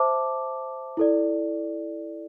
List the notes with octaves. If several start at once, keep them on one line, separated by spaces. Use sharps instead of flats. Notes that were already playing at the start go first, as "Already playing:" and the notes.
Already playing: C5 E5 A5 D6
E4 A4 D5